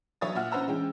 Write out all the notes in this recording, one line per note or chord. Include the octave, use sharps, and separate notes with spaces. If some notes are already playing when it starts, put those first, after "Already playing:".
F#3 C#5 E5 D#6 A6
A#2 E5 F#5 F6
C#4 B4 C5 F#5 A#5 E6
E3 G#3 C#4 G5